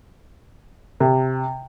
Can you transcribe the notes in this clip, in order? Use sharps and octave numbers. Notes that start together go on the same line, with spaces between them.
C3